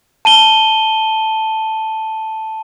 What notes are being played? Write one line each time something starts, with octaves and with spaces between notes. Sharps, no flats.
A5 D#7 G7